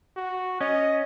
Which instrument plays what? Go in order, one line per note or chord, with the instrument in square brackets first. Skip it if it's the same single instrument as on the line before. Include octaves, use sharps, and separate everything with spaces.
[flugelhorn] F#4
[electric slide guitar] C#4 [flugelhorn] D#5